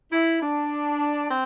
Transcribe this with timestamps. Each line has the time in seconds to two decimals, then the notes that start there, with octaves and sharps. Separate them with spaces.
0.11 E4
0.41 D4
1.30 C4